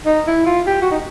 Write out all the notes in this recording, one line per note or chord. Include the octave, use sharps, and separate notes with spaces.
D#4
E4
F4
G4
F#4
D#4